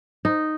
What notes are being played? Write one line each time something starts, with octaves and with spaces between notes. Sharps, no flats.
D#4